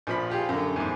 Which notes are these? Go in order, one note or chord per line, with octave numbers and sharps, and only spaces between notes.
A#1 F3 B5
F4 G4 G#4
F#2 D3
E2 G#2